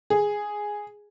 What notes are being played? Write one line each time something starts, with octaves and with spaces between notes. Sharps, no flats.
G#4